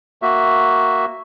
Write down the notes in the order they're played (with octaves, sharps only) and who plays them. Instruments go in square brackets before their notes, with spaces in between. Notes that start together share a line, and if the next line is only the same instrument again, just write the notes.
[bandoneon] A#3 F#4 E5